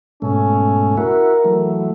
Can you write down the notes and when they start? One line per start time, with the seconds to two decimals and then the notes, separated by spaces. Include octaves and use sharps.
0.22 G#2 B2 A3 C#4
0.97 E4 F#4 A#4
1.45 E3 F#3 A3